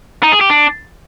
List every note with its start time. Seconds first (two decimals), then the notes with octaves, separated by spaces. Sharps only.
0.23 D#4
0.32 G#4
0.41 G4
0.50 D4